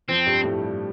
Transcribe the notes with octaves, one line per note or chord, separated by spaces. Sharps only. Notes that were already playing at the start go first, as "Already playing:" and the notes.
F2 F3 C4
G2 G3
A2 A3
G2 G3